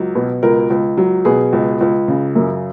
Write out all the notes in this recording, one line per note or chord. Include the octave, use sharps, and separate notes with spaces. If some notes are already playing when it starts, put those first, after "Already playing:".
Already playing: C#2 F#3
B2
C#2 A#4
C#2
F#3
B2 G#4
C#2
C#2
C#3
F#2